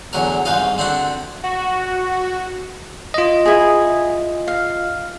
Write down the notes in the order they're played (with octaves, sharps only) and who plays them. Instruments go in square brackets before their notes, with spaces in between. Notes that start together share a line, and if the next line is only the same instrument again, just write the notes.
[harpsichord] E2 D3 F#3 A#4
C2 G#2 B4 D#5 F5
D3 C4 D4 E4 F#4
[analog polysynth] F#4
[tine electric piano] F4 D#5
[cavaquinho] E4 G#4
F5